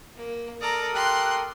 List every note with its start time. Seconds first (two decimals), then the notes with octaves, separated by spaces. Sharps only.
0.17 A#3
0.61 A4 A#4 D5 A#5 D#6
0.95 G4 C6 F#6